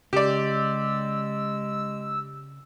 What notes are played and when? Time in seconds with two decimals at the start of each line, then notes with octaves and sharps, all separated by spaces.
0.13 C#3 G#3 G4 D5 E6